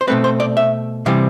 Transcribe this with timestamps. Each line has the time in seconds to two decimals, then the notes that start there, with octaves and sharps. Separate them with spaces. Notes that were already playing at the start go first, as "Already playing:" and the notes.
0.01 C5
0.07 B2 A3 C4 B4
0.24 C5
0.40 D5
0.57 E5
1.06 C3 E3 G3 C4 F5